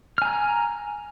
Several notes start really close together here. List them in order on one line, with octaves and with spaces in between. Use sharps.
F6 G#5 A#5